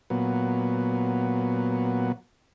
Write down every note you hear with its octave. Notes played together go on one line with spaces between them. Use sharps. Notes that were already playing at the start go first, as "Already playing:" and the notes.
A#2 F#3 B3